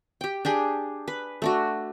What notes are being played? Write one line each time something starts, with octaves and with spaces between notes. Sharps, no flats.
G4 G5
D4 G4 G#4
B4
A3 D4 F#4